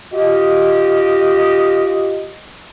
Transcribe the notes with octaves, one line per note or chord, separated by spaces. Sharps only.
F4 G4 D#5